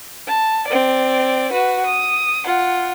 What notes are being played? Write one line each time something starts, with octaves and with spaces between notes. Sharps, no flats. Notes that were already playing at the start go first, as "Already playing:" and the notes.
A5
C4 D5
F#4 B4
D#6
F4 F#5